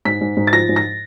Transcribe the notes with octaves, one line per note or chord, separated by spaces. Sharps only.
G#2 B6
G#2
G#2
A6
F3 A#6
G#2
A#6